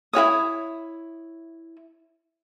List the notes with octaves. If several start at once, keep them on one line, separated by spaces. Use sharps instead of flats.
E4 F#4 C#5 D#6